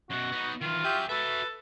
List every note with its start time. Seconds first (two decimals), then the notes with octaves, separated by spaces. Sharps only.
0.10 F#2 B2 F#4
0.32 B3 D#4
0.61 D#3 E3 F4
0.84 F#4 G4 E5 G#5 G6
1.09 F#4 A4 B4 E5